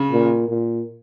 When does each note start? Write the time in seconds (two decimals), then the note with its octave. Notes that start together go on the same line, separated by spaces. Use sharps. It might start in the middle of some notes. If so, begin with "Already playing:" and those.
Already playing: C#3
0.12 A#2
0.49 A#2